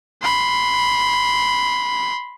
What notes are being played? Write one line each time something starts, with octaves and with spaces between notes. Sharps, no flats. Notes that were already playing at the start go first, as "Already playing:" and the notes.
B5 C6